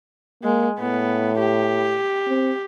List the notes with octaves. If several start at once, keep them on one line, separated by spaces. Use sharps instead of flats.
G#3 A#3
A2 B3
G4
C4